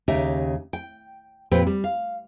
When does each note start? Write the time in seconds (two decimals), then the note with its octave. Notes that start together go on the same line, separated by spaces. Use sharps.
0.08 D#2 C#3 D#4 G4 E5
0.73 G5
1.51 F2 A#2 C4 G4 B4 G5
1.67 G3
1.84 F5